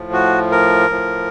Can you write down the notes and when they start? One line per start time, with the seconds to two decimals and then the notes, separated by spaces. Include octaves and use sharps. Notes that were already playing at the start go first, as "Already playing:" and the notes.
Already playing: A2 F3
0.13 F#4
0.52 A#4
0.89 A2 F3